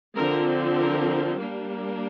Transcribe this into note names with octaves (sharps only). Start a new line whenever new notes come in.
D3 F3 C4 A#4
A#4
G3 A#3 D4